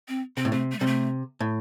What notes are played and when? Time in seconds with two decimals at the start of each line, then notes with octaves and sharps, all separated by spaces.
0.08 C4
0.37 C3 C4
0.45 A2
0.52 C3 A3
0.72 A3
0.79 C3 G3
0.86 A3
1.40 A2